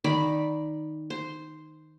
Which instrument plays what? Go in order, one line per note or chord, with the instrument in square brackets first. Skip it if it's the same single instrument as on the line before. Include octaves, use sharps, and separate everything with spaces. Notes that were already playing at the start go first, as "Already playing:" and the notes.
[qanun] D#3 D5 B5
C5